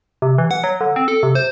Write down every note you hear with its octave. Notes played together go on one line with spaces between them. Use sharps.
C3
E3
F#5
F#3
D3
C4
A4
C3
C5